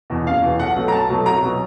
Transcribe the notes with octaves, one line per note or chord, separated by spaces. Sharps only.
E2 B2
F#1 F5
E2 B2
B1 F#5
B2 F#3 A3
A#5
B1 A5
B2 F#3 A3
C2 A#5
B2 F#3